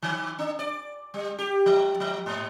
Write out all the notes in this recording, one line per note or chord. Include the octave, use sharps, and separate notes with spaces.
D#3
D4
D5
G3
G4
F3
F3
G#2